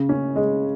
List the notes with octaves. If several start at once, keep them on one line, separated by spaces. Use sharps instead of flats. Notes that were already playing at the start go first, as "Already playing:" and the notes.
Already playing: C#3
C#4
G#3